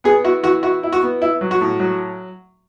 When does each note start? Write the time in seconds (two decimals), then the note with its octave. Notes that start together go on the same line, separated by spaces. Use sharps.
0.04 B3 G#4
0.24 E4 F#4
0.43 E3 F#4
0.63 E4 F#4
0.83 E4
0.92 F#4
1.03 B3
1.22 E4
1.41 F#3
1.51 F#4
1.61 A2
1.80 F#3